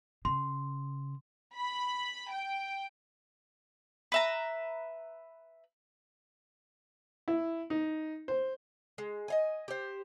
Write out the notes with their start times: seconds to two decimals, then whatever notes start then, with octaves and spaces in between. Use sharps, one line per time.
0.25 C#3 C6
1.55 B5
2.30 G5
4.12 B4 E5 A#5
7.28 E4
7.70 D#4
8.28 C5
8.98 G#3
9.28 D#5 F5 G#5
9.68 G4 C5